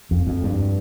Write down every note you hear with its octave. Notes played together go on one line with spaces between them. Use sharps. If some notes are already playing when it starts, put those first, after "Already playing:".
F2
F2
G2